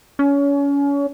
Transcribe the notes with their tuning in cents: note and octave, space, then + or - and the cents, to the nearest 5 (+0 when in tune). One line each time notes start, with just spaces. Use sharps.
C#4 +30